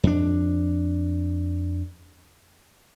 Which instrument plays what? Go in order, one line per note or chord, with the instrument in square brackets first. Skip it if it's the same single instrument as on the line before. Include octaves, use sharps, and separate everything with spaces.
[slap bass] F2 D4